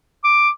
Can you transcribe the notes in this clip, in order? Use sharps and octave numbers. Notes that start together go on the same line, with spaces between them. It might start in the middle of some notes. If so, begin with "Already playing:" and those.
D6